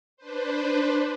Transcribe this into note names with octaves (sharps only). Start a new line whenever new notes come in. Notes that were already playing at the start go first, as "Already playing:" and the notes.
D4 B4 C5